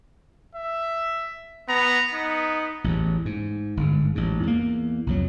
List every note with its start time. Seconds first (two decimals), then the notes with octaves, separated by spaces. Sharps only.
0.55 E5
1.69 B3 A#5
2.13 B3 D#4
2.84 A1 E2
3.25 G#2
3.77 G1 G#2
4.15 A1 G#2
4.43 E2 A#3
5.07 C2 F2 F#3